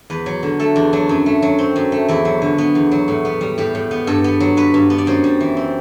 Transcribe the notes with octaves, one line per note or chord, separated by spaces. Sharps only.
E2 B4
F#3
D3
A3 A4
E2 D4
F#3 D4
F#2
A3
F#3
C4
F#2
A3
E2 E4
F#3
D3
B3
E2
F#3
A2
B3
G3
A2 G4
A2
B3
G2 A4
B3
F#3
G2 B4
G2
B3
D5
F#2 C5
G3
E3
C4